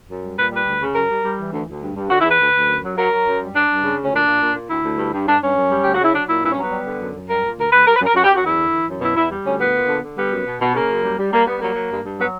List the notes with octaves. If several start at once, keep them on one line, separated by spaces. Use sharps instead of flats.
F#2
G3
A#2 B4
G3 B4
D2
C#3
F#2 A#4
G3
G3
E3
D2
D2
G2
G2
D3 F#4
E4
E2
B4
D2
D2
F#2
F#3
F#3 A#4
F#3
F#2
G3
G2 D4
G2
C#3
D2
C#4
A#2 D4
A#2
A#2
A#2
D2 E4
D2
G2
G2
G2 D4
G2 C#4
F#2
G3
D2 G4
F#4
C#3 E4
F#3 D4
A#2 E4
G2 E4
C#4
F#3 B3
G3
D3
F#2
F#2
G3 A#4
A#2
D2 A#4
D2 B4
G3 A#4
B4
F#2
A#4
F#2 F#4
G4
F#2
F#4
E2 E4
D3
E3
F#2
B2 E4
E2 E4
G3
D2 C#4
A#2 B3
A#2
D3
D3
G3 B3
F#2
B2
B2
C#3 A#3
F#2
G3
G3
G3 A#3
G3 B3
F#3 A#3
F#3
G2
G2
F#3 B3